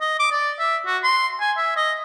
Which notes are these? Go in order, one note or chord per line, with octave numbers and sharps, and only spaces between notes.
D#5
D6
D5
E5
F#4
C6
G#5
E5
D#5